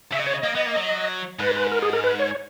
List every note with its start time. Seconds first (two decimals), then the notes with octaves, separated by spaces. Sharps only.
0.12 C#3 E5
0.19 D#5
0.26 C#5
0.34 D#5
0.44 A#3
0.55 B3
0.66 A#3
0.76 F#3
1.39 G#2 B4
1.56 B4
1.72 A#4
1.82 G#4
1.93 A#4
2.04 B4
2.19 C#5
2.31 C#5